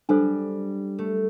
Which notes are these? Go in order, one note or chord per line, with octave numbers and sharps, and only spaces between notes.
G3 D4 A4 C5
A3